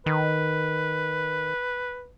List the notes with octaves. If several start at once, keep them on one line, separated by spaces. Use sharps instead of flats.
D#3 B4